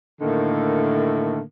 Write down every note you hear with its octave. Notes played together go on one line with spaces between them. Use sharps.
A2 D3 D#3 A3 A#3